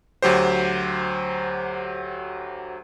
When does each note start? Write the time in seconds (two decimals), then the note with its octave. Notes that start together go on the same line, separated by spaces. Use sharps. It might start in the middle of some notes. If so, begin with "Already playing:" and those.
0.22 D2 F#3 G4 C5